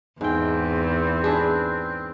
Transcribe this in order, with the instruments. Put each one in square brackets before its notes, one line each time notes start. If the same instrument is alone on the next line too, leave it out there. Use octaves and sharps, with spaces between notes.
[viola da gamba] E2 [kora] G#2 G5 [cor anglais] C4
[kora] D4 G#4 B4